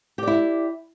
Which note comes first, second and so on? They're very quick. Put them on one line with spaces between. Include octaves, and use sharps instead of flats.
G4 D5 E4